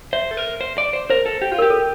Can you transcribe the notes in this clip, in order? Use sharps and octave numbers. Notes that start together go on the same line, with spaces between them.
C5 E5
A4
A#4
C5
D5
C5
A#4 C5
A4
G4
F4
A#4
G4
A4